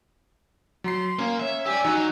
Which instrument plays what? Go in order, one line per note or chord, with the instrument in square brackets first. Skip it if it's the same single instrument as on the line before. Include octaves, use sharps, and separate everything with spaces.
[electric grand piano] F#3 A#5 C7 [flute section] C6
[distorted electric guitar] A#3 [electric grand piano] C#4
[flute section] C#5 [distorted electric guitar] E5
[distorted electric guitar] G4 D5 [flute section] G#5 E6
[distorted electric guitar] F#3 [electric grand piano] D#4 F#4